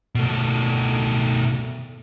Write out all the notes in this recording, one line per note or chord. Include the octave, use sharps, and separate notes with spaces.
B2 A3